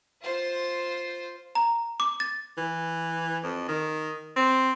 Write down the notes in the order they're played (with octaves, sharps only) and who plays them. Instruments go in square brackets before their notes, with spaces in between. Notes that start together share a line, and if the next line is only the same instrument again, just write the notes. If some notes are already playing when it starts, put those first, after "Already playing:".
[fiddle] F4 C5
[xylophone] A#5
D6
A6
[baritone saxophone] E3
F2
D#3
C4